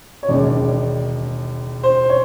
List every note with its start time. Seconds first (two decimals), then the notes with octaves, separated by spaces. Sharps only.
0.23 C#5
0.28 E1 D#2 C#3 D5
1.83 C5
2.09 C#5